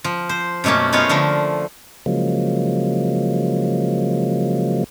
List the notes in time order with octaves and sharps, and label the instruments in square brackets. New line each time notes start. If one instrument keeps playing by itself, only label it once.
[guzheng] F3
C5
F#2 B2 A3 A#3 C#4
B3 C#4 D#4 F4 C#5 F5
D3 F3 A3 A#4
[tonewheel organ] C#3 F3 F#3 G#3 A#3